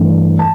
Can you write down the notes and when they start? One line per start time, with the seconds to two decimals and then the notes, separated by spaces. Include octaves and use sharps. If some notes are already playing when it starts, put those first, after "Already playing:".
Already playing: G2 E3 A3
0.39 A5